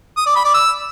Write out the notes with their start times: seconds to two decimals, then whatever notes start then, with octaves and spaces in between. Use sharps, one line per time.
0.17 D#6
0.27 D5
0.36 B5
0.45 D5
0.54 E6